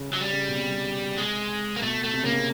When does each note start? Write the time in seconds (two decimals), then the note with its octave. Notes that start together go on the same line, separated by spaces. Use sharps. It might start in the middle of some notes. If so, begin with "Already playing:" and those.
Already playing: C#3
0.11 C#3 F#3
0.22 G3
0.33 C#3
0.48 B2
0.54 C3
1.18 G#3
1.76 A#3
1.82 B2 A3
2.04 A3
2.14 C3
2.23 C#3 A#3
2.32 C3